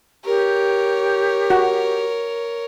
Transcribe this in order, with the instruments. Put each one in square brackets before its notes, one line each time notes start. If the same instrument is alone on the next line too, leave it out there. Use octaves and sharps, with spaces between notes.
[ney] G4 [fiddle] A#4 C#5
[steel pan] F#4